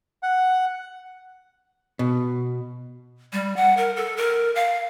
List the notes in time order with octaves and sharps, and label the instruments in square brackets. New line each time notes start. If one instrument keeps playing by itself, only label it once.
[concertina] F#5
[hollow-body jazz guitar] B2
[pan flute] G3
F#5
A#4
A4
A#4
F5